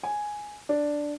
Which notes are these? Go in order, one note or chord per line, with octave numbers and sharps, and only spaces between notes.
G#5
D4